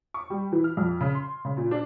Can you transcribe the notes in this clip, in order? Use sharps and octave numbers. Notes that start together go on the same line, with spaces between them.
C#6
G3
E3
F6
F2
C#3
C6
C#3
A#2
D4